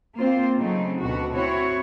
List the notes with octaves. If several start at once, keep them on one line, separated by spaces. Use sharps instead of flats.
A#3 C4 F4 C5
C#3 F#3 A3 C4 D#4
D2 B2 F#4
C4 E4 F#4 C#5